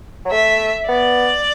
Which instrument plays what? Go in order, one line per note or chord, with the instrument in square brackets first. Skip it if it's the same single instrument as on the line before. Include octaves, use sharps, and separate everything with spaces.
[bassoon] F#3
[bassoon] A3 [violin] E5
[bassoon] B3 [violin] D5